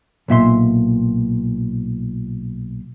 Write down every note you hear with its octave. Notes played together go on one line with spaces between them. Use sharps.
B1 A#2 E5 C6